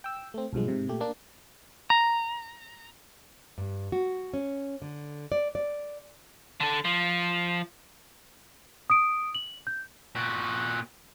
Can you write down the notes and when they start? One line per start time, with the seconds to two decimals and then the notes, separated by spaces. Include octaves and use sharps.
0.04 G5 E6
0.34 A3 C4
0.53 B1 G2 F3 G#3
0.68 G#2 C3
0.88 A#2 A3 G4
1.00 A#3 D4
1.90 A#5
3.58 G2
3.92 F#4
4.34 C#4
4.82 D3
5.32 D5
5.55 D5
6.60 D3 A4
6.85 F3
8.90 D#6 D7
9.35 F#7
9.67 G6
10.15 A#2 F#4